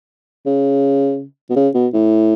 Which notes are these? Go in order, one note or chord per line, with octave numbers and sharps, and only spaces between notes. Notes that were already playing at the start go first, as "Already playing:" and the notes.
C#3
B2
C#3
B2
A2